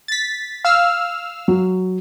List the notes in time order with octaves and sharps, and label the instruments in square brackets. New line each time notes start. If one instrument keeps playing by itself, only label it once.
[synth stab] A6 B6
F5 E6 F6
[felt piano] F#3